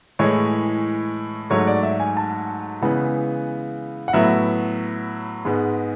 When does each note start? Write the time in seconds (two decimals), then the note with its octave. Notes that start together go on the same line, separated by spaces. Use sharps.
0.19 A2 E3 G#3 C#5
1.50 G#2 F#3 A3 C#5
1.67 D5
1.83 E5
2.00 G#5
2.17 A5
2.82 C#3 E3 G#3 B3 F#5
4.08 F#5
4.13 A2 F#3 B3 E5
5.45 G#2 G#3 B3